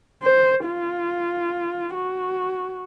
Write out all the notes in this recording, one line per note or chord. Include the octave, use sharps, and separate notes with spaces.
C5
F4
F#4